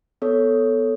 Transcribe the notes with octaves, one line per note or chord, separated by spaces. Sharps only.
B3 A4 C#5